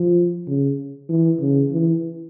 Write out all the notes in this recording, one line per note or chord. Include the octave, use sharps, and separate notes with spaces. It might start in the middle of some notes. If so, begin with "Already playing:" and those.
Already playing: F3
C#3
E3
C#3
E3